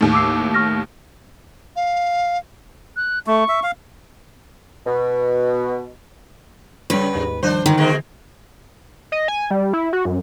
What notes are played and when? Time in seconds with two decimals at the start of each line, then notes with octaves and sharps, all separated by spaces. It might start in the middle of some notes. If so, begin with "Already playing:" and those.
0.01 D#2 A2
0.13 D6 E6 C7
0.54 C#6 F6 A#6
1.76 F5
2.96 F#6
3.27 A3 C#6
3.49 E5
3.63 F5
4.87 B2
6.90 C#3 G3 B4 C#5 G5
7.15 D#2 G#2
7.43 D#3 F3 G3 D4 C5
7.66 A#2 D3 D#3
7.77 B2 G#3 A#3
9.12 D#5
9.28 G#5
9.51 G3
9.73 E4
9.93 F#4
10.05 F#2